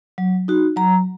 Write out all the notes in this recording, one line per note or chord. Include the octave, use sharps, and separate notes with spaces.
F#3
D#4 F#4
F#3 A#5